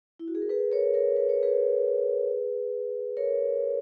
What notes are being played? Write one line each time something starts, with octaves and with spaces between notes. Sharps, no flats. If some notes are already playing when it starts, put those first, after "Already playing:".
E4
F#4
G#4
A#4
G#4 B4
A#4 C#5
A#4 C#5
B4
C#5
G#4 B4
A#4 C#5